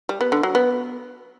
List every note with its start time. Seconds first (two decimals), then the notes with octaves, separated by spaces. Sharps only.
0.09 G3
0.21 B3
0.32 D3
0.43 F#3
0.55 B3